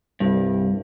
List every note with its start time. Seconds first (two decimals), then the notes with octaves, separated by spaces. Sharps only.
0.20 C2 G2